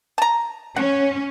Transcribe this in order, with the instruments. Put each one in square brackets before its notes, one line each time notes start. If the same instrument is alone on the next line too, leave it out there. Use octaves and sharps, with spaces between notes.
[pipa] A5 A#5
[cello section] C#4 [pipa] F#5